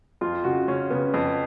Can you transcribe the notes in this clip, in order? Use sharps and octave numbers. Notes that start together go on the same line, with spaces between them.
F2 F4
C#3 F#4
C#3 C#4
C#3 B3
F2